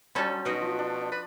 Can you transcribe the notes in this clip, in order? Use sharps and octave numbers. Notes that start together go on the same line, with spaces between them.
F#3 G3 C#4 D4 A4 C5
B2 D#4 F#4
F3
D4
B4 D5